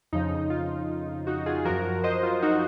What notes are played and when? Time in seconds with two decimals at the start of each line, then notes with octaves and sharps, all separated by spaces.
0.13 F2 C#3 F3 D#4
0.50 F4
1.27 D#4 F#4
1.46 F4 G#4
1.65 F#2 F3 F#4 A#4
2.04 C5 D#5
2.23 F4
2.42 D#4 F#4